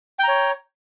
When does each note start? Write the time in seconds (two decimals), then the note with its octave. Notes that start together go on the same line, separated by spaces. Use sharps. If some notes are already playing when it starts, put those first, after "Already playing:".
0.19 G5
0.24 A#5
0.28 C#5